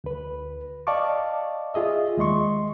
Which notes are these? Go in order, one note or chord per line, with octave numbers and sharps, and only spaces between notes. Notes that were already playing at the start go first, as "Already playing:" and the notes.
D2 B4
D5 D#5 F5 A5 C#6 D6
F4 G#4 D#5 E5
D#2 G#3 D#5 C6 C#6